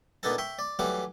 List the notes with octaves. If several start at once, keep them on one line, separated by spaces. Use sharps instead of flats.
A#2 B3 D4 D#4 A4 A5
E5 G5 C#6
D5
E3 F#3 G3 A3 F#5 D6